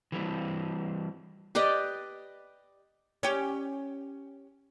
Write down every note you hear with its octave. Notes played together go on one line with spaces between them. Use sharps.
E3 G3 B3 C4
G4 B4 D5 D#5
C#4 G4